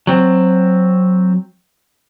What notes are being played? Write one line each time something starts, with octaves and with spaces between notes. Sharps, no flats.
F#3 C4